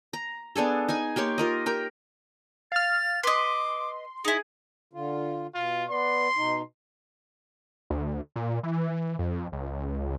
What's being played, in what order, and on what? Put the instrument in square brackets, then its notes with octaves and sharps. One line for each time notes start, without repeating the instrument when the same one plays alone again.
[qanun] A#5
B3 D4 G#4 A4
D#4 G#4 G#5
A#3 G4 C#5 C6
F4 A#4 D#5
G4 A#4 G5
[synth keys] F5 F6 [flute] A6
[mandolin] B4 D#5 [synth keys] C6 [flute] D6
[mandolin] D#4 E4 [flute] G#4
[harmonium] D3 F4
[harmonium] B2 [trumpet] F4
[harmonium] B3 B4 D5 [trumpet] C6
[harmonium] B2 D#4
[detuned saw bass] D2
A#2
E3
F2
C#2